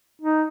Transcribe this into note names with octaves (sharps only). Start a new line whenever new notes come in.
D#4